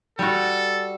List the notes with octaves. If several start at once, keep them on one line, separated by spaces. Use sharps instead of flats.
G3 F#4 A4